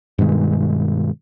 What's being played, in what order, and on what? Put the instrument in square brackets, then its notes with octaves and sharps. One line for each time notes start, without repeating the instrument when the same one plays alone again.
[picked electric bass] G2 B2 D#3 G#3